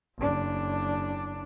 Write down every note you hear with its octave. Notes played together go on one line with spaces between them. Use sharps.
F#1 D4